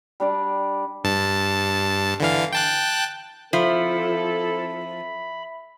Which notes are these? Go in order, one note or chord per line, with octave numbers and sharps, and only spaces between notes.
G3 D4 D5
G2 A5
D3 E3 F5
G5 A5 F#6
F3 C4 E4 A4 E5 B5